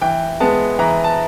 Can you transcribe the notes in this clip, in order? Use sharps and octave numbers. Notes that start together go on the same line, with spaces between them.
E3 G5
G#3 B3 A5
E3 A#5
A5